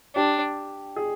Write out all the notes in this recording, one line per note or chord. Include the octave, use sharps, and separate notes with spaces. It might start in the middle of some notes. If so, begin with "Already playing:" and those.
D4 G4
G#4